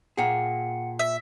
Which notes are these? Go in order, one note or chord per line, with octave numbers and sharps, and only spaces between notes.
A#2 G#4 F#5 G5 C#7
E5